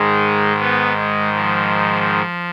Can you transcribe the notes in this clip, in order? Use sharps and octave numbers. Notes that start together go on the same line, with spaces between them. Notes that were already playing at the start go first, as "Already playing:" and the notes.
Already playing: G#2 D#3 G#3
B3
G#3
F3